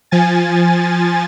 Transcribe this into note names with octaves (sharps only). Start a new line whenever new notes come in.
F3 G#5 A6